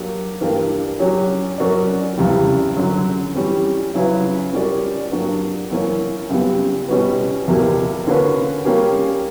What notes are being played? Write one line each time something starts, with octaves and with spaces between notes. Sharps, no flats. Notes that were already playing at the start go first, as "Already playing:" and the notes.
Already playing: F#3 A#3 D4 G4
G2 E3 A#3 D4
F#3 C#4 G4 C#5
F#3 C#4 F#4 A#4 D5
E2 C#3 G3
F#2 D3 F#3
E3 G3 C#4
C#3 F#3 C#4 E4 B4
G3 C#4 F#4 A#4 D5
G2 F#3 A#3 D4 F#4
F#2 E3 A#3 C#4
F#2 C#3 G3 B3
B2 G3 C#4 F#4 B4
E2 B2 A#3 E4 G4
D3 A#3 C#4 F#4 B4
G3 A#3 C#4 G4